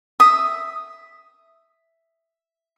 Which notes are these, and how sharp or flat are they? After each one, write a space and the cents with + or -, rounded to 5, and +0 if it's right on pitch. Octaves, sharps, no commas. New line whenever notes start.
E5 +0 D#6 +0